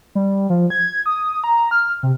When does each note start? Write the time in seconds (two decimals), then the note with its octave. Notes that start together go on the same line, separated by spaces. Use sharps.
0.15 G3
0.50 F3
0.70 G#6
1.06 D#6
1.44 A#5
1.71 F6
2.03 C3